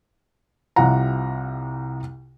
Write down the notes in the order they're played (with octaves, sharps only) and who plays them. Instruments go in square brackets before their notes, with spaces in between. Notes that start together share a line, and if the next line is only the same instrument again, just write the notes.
[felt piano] C2 C3 F4 F#5 A#5